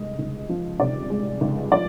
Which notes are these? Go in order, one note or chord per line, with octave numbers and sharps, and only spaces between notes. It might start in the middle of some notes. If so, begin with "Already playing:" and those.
Already playing: C3 G#3 D#5
C#2
F3
C3 D5
G#3
C#2
F3 D5